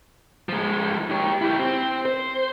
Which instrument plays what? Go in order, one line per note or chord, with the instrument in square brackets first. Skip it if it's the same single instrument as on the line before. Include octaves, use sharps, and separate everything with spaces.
[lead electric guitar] F3 G#3
G4 C#5
E4 G4
C4
C5